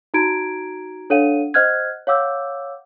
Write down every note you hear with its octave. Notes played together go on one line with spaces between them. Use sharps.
D#4 F#4 A#5 G#6 D7
D4 A4 C#5 F5 F#5 D#7
C5 D#5 F#5 F6 F#6 G#6
C#5 F5 F#5 D6 E6 G6